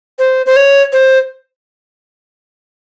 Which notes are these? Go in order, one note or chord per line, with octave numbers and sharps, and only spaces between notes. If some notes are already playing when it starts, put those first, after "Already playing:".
C5
C5
C#5
C5